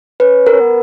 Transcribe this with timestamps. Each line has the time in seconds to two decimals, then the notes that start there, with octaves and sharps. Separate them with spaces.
0.20 C#4 B4
0.47 A#4
0.52 C#4
0.60 B3